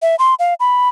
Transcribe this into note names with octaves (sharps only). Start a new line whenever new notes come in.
E5
C6
F5
B5